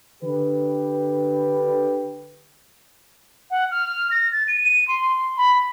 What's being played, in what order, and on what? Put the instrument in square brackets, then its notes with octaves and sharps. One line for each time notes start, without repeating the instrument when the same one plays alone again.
[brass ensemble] D3 G4 B4
[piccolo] F#5
F6
A#6
A6
D#7
D#7
C6
B5